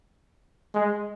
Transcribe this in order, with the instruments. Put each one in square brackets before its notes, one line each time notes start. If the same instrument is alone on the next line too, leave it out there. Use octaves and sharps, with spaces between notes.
[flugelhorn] G#3